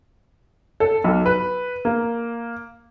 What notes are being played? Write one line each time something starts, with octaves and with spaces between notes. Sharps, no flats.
A4
B1
B4
A#3